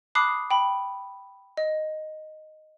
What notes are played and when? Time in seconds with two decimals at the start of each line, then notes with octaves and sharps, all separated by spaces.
0.15 A5 B5 D6 D#6 F#6 C7
0.51 G5 B5
1.57 D#5